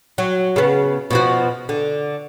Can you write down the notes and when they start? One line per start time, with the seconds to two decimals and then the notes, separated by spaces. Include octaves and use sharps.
0.18 F#3
0.56 C#3 B3
1.11 B2 F3 F#4
1.69 D3